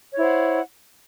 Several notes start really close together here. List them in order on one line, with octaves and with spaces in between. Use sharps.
C#5 E4 C5 F#5